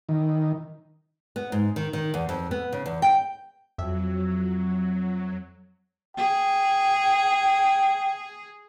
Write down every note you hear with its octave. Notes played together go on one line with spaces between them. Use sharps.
D#3
B3
G#2
D#3
D#3
E2
F2
B3
C#3
E2
G5
F2 F#3 E5
G#4 G5